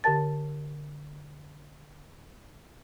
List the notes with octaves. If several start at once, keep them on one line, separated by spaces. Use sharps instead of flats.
D3 G4 A#4 A5 A6